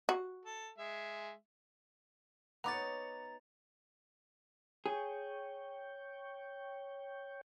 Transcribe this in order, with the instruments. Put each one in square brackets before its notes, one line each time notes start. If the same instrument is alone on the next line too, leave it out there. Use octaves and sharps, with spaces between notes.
[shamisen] F#4
[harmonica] A4
G#3 E5
[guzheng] B3 D#4 C#5 [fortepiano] F#5 B5 D6 [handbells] A#5 A6
[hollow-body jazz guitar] G#4 [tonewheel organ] C#5 G5